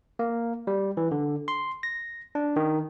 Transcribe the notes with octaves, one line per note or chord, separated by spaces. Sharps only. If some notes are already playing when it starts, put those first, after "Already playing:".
A#3
G3
E3
D3
C6
A#6
D4
D#3